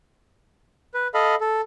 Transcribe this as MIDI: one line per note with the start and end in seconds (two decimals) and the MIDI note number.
0.94 1.08 71
1.14 1.35 69
1.14 1.35 75
1.14 1.35 77
1.14 1.35 83
1.41 1.61 69